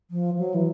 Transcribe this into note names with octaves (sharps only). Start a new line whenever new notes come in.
F3
F#3
E3